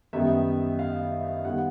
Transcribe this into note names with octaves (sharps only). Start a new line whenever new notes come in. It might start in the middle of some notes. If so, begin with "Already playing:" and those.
F#2 D#3 G3 B3 D#4 E5
F5
D#3 G3 B3 F#5